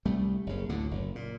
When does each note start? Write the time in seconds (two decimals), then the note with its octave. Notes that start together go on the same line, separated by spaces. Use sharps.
0.05 C2 G3 A3
0.46 F#1 C#3
0.69 D2 A2 D3
0.91 F#1
1.15 A#2